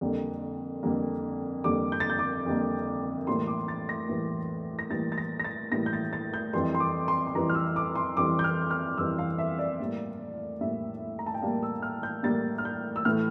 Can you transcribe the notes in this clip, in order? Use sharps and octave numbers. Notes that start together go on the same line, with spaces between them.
F2 D3 G3 A#3
F2 D3 G3 A#3
F2 D3 G3 A#3 D6
G6
A6
G6
D6
F2 D3 G3 A#3
A2 E3 G3 A#3 C6
D6
A6
A#6
A2 E3 G3 A#3
A#6
A2 E3 G3 A#3 A6
A6
A#6
A#6
A6
A2 E3 G3 A#3 A#6
G6
A6
A6
G6
F2 E3 G3 C6
C6
D6
C6
C6
F2 E3 G3 A#5
F6
E6
D6
C6
F2 E3 G3 D6
G6
F6
F6
F2 E3 G3 E6
F5
E5
D5
A2 G3 A#3
A2 G3 A#3 E5
A#5
A5
G5
A2 G3 A#3 F5
E6
F6
G6
A2 G3 A#3 A6
F6
G6
E6
A2 E3 A3 F6